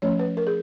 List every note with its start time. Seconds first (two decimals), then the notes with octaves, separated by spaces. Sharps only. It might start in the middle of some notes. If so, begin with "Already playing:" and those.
0.02 F3 A3 C#4 C#5
0.19 B4
0.37 A#4
0.47 G#4